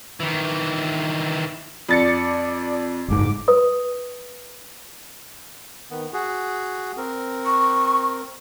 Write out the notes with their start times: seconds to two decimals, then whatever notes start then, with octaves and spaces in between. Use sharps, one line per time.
0.20 D#3 E3
1.89 F2 D5 A6 C#7
3.08 F#1 G#2 D6
3.48 B4 D#6
5.91 D#3 B3
6.13 F#4 G#4
6.97 C4 A#4
7.46 C#6